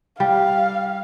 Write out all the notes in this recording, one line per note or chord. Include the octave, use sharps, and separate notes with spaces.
G3 F5